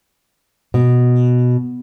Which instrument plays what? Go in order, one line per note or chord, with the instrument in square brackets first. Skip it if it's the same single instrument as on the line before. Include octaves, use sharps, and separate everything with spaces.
[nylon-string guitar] B2